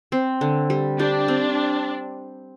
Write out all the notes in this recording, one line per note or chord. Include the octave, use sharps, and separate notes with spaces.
C4
D3
G3
D4 G4
C4